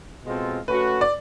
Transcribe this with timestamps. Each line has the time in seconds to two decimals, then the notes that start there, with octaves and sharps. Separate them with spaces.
0.25 B2 G#3 C4 F4 A4
0.68 A3 C#4 F#4 B4
1.01 D5